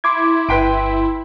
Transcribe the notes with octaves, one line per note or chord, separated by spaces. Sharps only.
E4 C6 D6 G#6
G1 B4 G5 C6 B6 D7